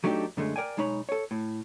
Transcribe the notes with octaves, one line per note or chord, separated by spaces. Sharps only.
F#3 A3 D4 D#4 G4
F#2 D3 G#3 A3
A#4 D5 G5 G#5
B1 G#3 D#4 C#5 B5
A4 C#5
A2